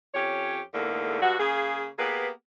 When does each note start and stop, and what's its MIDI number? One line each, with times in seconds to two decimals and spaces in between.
0.14 0.59 41
0.14 0.59 61
0.14 0.59 67
0.14 0.59 73
0.73 1.18 40
0.73 1.18 44
0.73 1.18 50
0.73 1.18 57
0.73 1.18 58
1.20 1.35 43
1.20 1.35 66
1.38 1.86 49
1.38 1.86 58
1.38 1.86 68
1.98 2.27 58
1.98 2.27 59
1.98 2.27 67
1.98 2.27 68
1.98 2.27 71